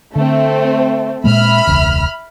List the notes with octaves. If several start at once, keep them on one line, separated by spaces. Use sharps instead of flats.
D3 A3 C4
A#2 G#3 A#3 E5 B5 F6
E1 C#2